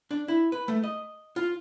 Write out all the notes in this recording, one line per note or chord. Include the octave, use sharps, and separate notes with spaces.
D4
E4
B4
A3
D#5
F4